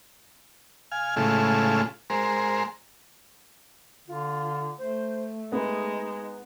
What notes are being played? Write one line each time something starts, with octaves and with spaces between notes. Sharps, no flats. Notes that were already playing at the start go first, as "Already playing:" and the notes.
F5 G#5
A2 C#3 G#3 A3 E4 F4
G#3 A#4 C5
D3 F4
A3 C5
G#3 B3 D#4